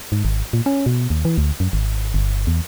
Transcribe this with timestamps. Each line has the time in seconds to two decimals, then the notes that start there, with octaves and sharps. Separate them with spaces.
0.12 G#2
0.25 G#1
0.53 A#2
0.66 C#4
0.86 B2
1.10 D#2
1.25 E3
1.38 D2
1.60 F#2
1.73 G#1
2.14 G1
2.47 E2